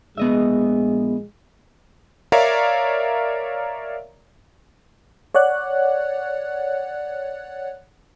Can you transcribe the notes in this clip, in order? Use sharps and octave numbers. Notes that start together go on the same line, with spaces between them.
A#1 G#3 B3 D#5 E5
A#4 C#5 D5 E5 F5 A#5
C#5 D5 F#5 F#6